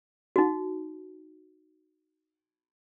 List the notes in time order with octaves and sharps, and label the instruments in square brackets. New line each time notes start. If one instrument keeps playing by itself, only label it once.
[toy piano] D#4 F#4